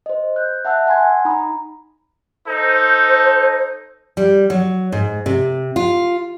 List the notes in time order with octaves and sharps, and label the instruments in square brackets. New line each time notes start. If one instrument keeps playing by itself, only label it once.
[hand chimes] C5 D#5
F#6 G6
E5 F#5 A5 E6 F#6
F#5 G#5 C6 G#6
D#4 A#5 B5 D#6
[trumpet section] D#4 A4 [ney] C5
[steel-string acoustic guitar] G3
F#3
G#2
C3
F4